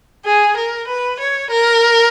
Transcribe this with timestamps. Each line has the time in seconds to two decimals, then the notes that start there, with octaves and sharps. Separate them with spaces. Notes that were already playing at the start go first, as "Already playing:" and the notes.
0.25 G#4
0.57 A#4
0.88 B4
1.20 C#5
1.51 A#4